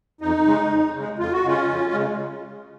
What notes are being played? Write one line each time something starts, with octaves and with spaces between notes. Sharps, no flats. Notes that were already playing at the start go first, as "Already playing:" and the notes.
F2 D#4
C#3 G#3
F2
C#3 G#3
F2 F4
F#4
C#3 G#3 C#4 F4
F2
C#3 G#3